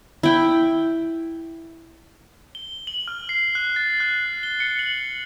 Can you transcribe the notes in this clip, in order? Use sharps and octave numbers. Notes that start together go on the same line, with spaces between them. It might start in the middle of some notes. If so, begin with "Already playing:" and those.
E4 G5
G7
F#7
F6
C7
F#6
A6
F#6
G7
C#7
F#7